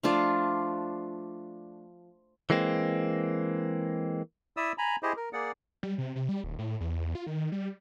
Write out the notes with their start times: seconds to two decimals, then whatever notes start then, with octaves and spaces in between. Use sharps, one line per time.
0.03 F3 A3 D4 F4
2.50 E3 G#3 A#3 C4
4.57 E4 D5 E5 D#6 E6
4.78 G#5 A#5 B5
5.03 E4 G4 G#4 C5 D#5
5.17 A#4
5.33 A#3 G#4 D5 F#5
5.83 G3
5.98 C3
6.16 C3
6.29 G3
6.44 D#1
6.59 A2
6.81 E2
7.15 F4
7.27 D#3
7.52 G3